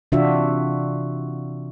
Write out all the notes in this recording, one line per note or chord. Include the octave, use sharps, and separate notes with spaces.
C3 E3 D4 F4 F#4 E5